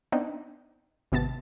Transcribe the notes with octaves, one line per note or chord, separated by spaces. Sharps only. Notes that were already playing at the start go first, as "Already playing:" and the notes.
B3 C4 D4 D#4
G#1 C3 B3 A5 A6